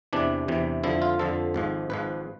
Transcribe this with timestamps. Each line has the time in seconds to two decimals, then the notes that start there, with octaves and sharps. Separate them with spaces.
0.13 E2 C3 E3 D4
0.48 E2 C3 E3
0.84 F2 D3 F3 E4
1.02 F4
1.19 F2 D3 F3 A4
1.54 G#1 G#2 F3
1.90 G#1 G#2 F3 B4